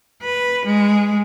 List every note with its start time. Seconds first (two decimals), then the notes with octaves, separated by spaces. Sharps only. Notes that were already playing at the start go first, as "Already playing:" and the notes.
0.22 B4
0.65 G#3